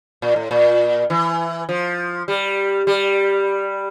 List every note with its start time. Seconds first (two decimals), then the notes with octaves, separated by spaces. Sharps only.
0.22 A#2
0.36 A2
0.51 A#2
1.10 E3
1.69 F3
2.28 G3
2.87 G3